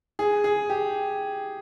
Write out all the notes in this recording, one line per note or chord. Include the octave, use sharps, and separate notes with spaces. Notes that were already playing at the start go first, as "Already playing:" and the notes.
G#4
G#4
G4